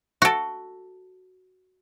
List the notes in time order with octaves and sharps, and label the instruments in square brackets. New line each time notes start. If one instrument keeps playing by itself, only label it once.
[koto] F#4 A4